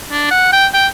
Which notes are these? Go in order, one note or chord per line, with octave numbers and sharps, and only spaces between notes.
D4
F#5
G5
G5